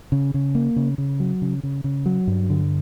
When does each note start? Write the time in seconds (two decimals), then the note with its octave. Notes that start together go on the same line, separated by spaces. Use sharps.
0.12 C#3
0.34 C#3
0.55 A#3
0.76 C#3
0.98 C#3
1.20 F#3
1.42 C#3
1.63 C#3
1.84 C#3
2.06 F#3
2.27 G2
2.50 D3